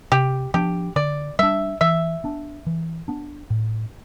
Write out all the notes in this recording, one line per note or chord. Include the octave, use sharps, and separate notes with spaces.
C3 G4
F3 B3 D4 G4
D3 D5
G3 D4 E5
E3 E5
B3 D4
E3
B3 D4
A2